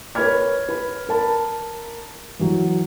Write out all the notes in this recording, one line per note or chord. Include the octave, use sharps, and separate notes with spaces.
A#4 B4 C#5 B5 F6 G#6
B4 B5
A#4 A5 B5
E3 F#3